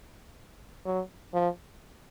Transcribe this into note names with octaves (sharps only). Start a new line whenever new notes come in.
F#3
F3